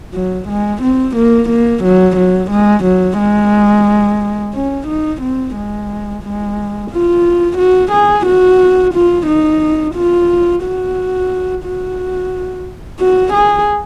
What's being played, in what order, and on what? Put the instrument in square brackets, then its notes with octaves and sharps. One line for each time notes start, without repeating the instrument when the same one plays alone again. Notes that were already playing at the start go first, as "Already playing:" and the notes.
[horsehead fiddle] F#3
G#3
C4
A#3
A#3
F#3
F#3
G#3
F#3
G#3
C#4
D#4
C4
G#3
G#3
F4
F#4
G#4
F#4
F4
D#4
F4
F#4
F#4
F#4
G#4